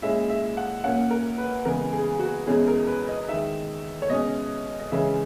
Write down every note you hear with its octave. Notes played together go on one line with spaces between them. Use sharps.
A#2 G#3 C#4 E4 E5
E5
F#5
A#2 A#3 C#4 F#5
A#4
B4
C#3 E3 G#3 B3 A#4
G#4
F#4
E2 B2 G#3 C#4 E4 G#4
A#4
B4
D#5
D#3 G#3 D#4 E5
C#5
B2 G#3 C#4 D#5
D#5
C#3 E3 G#3 C#4 E5